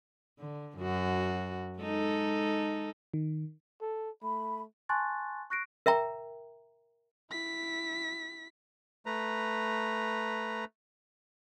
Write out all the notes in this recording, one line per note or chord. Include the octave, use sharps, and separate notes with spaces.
D3
F#2 F#4
G#3 D#4 A4
D#3
A4
A3 B5
G#5 A5 C6 C#6 F#6 A6
C#6 F#6 A#6 C7 D7
A#4 E5 G5 A#5
E4 B6
A3 B4 A#5